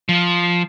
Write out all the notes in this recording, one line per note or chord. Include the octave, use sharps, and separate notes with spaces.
F3